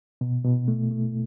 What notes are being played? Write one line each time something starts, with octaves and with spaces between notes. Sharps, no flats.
B2
B2
A3
A3